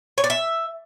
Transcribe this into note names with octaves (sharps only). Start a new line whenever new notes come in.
C#5
D5
E5